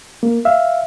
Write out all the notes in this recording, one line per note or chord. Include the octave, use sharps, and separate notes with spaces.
A#3
E5 F5